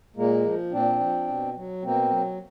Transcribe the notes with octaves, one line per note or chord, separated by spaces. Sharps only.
A#2 G#3 A#3
F3
A#2 C4 D4
F3
B2
F#3
B2 A#3 C4
F#3